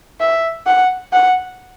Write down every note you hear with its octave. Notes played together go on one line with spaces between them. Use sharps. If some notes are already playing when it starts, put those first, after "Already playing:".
E5
F#5
F#5